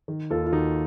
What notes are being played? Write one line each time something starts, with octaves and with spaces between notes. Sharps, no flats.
D#3
D#2 F4 A4
F4
D#2 D#4 F#4